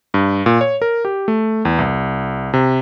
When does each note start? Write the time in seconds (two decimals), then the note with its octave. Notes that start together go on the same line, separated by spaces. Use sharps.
0.14 G2
0.46 A#2
0.61 C#5
0.82 A#4
1.05 G4
1.28 A3
1.65 E2
1.79 C2
2.54 C3